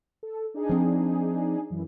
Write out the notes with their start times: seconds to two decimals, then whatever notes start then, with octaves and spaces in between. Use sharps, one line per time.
0.23 A4
0.54 D4 D#4 G#4
0.69 F3 C4
1.70 F#2 E3